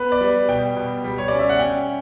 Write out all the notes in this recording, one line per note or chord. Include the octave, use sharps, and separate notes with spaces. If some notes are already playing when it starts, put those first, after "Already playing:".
Already playing: B3 B4
D5
G3
B2 G5
B2
G3
C#5
C#4 D5
E5
F#5
C#4 G5